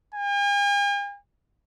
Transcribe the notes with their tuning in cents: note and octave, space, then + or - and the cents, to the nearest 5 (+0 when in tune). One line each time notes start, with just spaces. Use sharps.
G#5 -45